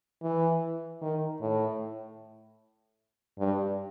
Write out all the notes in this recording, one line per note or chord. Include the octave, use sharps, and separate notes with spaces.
E3
D#3
A2
G2